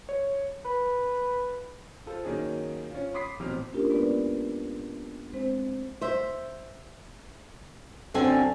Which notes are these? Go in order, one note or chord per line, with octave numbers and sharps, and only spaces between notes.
C#5
B4
F4 A4 C5
D#3 F#3 A#3 C#4 D#4 G#4
C#4 F4
B5 C6 D6 D#6 B6 C7
A1 B2 C4 D6 F6
A#3 C#4 D4 F4 G4 A#4
G#3 B3 D4 B4 D5
G#3 C4 C5
C5 E5
F#2 D3 C4 A4 G#5